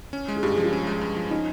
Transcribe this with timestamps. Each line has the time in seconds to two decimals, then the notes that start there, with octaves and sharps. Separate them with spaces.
0.13 C#4
0.28 G#3
0.36 G#4
0.43 G2 G4
0.53 G#4
0.58 F3
0.63 F4
0.73 C#4
0.87 G#3
1.01 G2
1.16 F3
1.31 C#4 D#4